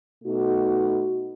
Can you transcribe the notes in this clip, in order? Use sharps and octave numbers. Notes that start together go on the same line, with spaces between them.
B2 A3 D#4 F#4